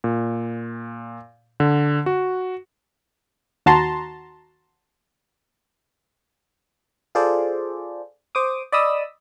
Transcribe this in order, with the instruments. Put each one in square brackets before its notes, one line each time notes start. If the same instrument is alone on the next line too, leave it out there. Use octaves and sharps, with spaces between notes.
[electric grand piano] A#2
D3
F#4
[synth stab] D#2 F#4 A5 A#5 C6
[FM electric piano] F4 G#4 A4 C5 D5
C5 D6 D#6
D5 D#5 B5 D#6 E6